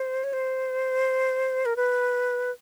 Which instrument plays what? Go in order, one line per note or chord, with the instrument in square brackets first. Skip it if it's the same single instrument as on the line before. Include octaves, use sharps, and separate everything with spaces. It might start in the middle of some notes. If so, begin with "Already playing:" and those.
Already playing: [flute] C5
C#5
C5
A#4
B4